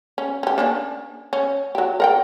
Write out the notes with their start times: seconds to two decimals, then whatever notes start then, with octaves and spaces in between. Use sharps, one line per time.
0.18 C#4
0.43 C#4 G4
0.58 A#3 C#4 D4
1.33 C#4
1.75 F#3 G4
2.00 A#4 F#5 G5